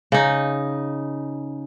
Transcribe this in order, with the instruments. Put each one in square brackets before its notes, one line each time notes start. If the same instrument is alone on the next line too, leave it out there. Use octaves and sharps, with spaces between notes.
[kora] C#3 D#4